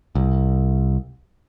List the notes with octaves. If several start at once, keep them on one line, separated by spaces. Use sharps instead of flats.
C2